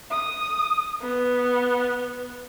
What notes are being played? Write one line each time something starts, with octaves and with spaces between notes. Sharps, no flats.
D#6
B3